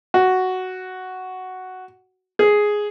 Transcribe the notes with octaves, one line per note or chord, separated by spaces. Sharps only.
F#4
G#4